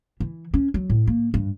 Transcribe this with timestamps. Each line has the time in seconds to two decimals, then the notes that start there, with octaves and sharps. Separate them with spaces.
0.20 E3
0.54 C#4
0.74 F#3
0.90 A2
1.07 A#3
1.34 G2